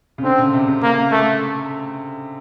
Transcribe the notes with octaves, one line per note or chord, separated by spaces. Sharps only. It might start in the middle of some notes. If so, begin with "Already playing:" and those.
C#3
D3 C4
C#3
C3
C#3
A#3
A3